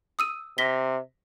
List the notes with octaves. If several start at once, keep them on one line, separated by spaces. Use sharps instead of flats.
D#6 E6 D#7
C3 A#6 B6 G7